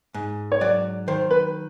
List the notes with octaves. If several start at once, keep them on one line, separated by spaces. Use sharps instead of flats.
G#2
C#5
F#3 D5
D#3 C5
B4